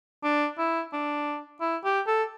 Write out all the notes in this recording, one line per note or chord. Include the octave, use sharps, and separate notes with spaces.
D4
E4
D4
E4
G4
A4